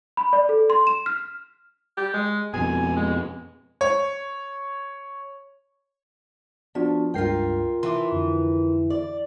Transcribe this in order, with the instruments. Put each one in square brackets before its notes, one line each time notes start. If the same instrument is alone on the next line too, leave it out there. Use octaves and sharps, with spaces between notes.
[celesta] B5
D5
A4
C6
E7
F6
[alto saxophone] G4
G#3
[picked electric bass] F2 B2 [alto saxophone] G#5
[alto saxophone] G#3
[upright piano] C#5
[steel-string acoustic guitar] F3 [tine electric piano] B3 D4 F#4
[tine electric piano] C#2 G2 C7 [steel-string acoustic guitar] F4 A#4 G5
[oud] E3 [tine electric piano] C6 D6
[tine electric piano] F2 D3
[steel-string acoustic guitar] D5